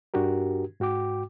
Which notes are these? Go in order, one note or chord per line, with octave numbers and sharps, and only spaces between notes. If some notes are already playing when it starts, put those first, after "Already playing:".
G2 D4 F#4 G4 A#4
G#2 F#4 G5 D6